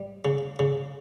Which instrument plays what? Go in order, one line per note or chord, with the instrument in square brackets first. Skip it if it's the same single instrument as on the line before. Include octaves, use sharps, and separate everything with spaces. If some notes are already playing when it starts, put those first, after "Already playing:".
Already playing: [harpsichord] G3
C#3
C#3